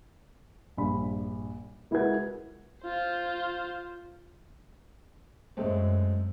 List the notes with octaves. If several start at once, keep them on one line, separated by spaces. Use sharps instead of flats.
A#1 G2 B5
G#3 E4 F#4 A#4 B4 G#6
F4 C5
F#2 G#3 A3 C4